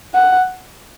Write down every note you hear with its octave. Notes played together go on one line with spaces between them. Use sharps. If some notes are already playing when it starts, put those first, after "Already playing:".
F#5